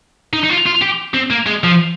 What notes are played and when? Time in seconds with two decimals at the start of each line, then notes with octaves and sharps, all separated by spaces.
0.33 D#4
0.44 D#4
0.49 F4
0.66 F4
0.81 G4
1.14 C4
1.30 A#3
1.46 G#3
1.64 F3